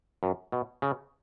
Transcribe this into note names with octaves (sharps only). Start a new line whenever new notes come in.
F#2
B2
C#3